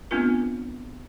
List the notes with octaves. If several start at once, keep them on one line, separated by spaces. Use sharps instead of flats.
A3 B3 C4 D4 F4 A#4